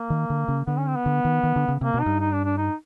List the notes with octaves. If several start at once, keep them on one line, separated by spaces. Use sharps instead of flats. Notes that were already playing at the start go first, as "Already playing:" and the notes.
Already playing: A#3
D#3
D3
C#3
D3 B3
C#4
C4
B3
D3
D#3
D#3
D3
C#3
C3 A#3
B2
D#4
G2
D#4
D4
D4
D#4